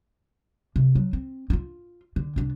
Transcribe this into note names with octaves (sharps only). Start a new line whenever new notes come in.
C3
F#3
C4
D#4 F4
D3
C2 D4